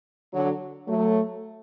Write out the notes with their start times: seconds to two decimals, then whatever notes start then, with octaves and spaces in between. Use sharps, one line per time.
0.33 D3 F#3
0.88 F#3 A3